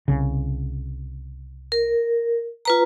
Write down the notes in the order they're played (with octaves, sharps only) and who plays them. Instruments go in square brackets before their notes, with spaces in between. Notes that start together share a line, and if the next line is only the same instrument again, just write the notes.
[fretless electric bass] C2 C#3
[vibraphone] A#4
F4 B4 A#5